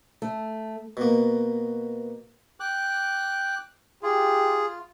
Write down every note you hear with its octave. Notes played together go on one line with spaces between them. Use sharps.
A3
B2 A#3
G5 D6 F#6
F4 G4 G#4